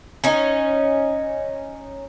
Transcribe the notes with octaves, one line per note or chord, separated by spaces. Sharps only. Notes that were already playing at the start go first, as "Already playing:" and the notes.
C#4 D#4